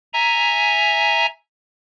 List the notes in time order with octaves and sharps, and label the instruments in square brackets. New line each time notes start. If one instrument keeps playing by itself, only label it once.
[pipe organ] E5 G#5 A#5